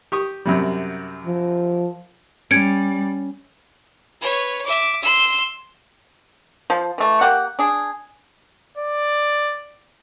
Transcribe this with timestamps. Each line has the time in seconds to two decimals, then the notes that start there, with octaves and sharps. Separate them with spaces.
0.12 G4 C#6 D#6
0.45 F#2 C3 G3
1.26 F3
2.51 G3 C#4 G#6 C#7 D7
4.21 B4 C#5
4.65 E5 D6
5.02 C6 E6
6.70 F3
6.98 E3 A3
7.21 A#3 G4 F#5
7.59 D4 G#4
8.77 D5